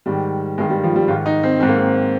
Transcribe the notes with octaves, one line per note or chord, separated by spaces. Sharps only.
G#2 D#3 G3
G2 D#3 G#3
G3
F3
G3
G#2 D#3 F4
D#4
C4
G#2 D#3 C4
A#3
C4